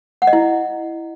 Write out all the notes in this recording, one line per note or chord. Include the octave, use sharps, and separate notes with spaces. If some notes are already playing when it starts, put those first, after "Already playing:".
F#5
D#5
E4